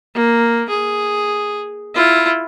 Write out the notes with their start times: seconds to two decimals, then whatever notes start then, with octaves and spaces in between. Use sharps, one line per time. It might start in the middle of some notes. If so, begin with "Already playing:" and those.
0.15 A#3
0.69 G#4
1.94 E4 F4